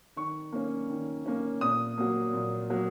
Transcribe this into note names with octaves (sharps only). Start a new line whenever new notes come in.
D#3 C#6
A#3 C#4
D#3
A#3 C#4
A#2 D#6
F#3 A#3
A#2
F#3 A#3